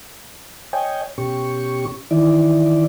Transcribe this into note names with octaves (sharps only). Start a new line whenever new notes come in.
C#5 D#5 G5 G#5
B2 C#4 G4 C#6
D#3 E3 E4 D5